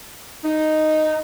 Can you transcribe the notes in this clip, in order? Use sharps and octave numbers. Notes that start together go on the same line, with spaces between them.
D#4